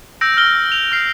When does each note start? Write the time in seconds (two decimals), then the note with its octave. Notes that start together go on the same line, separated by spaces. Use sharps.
0.21 E6 G6 A#6 D7
0.37 F6 A#6 G7
0.72 F7
0.92 F6 C7